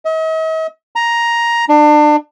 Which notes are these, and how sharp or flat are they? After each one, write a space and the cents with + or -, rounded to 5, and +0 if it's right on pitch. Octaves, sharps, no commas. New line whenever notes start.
D#5 +45
A#5 +10
D4 +30